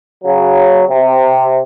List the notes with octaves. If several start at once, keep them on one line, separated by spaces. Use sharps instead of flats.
C#3 F#3
C3